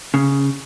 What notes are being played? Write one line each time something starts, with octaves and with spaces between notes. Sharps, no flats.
C#3